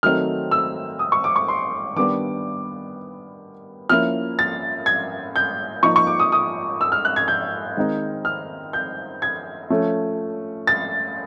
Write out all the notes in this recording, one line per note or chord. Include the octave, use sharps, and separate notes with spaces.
D#3 F#3 A3 C4 D#4 F6
E6
D#6
C#6
D6
C#6
C6
D#3 G3 B3 D4 D6
F3 A#3 C#4 E4 F6
A6
G#6
G6
F3 A#3 D#4 C#6
C#6
D6
D#6
D#6
E6
F6
F#6
G#6
G6
D#3 G#3 C4 D#4
F6
G6
G#6
F3 A3 C#4
A6